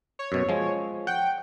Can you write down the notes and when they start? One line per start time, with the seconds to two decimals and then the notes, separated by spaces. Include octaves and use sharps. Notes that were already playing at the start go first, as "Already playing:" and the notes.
0.19 C#5
0.32 F#2 B2
0.49 F3 G#3
1.07 F#5 G5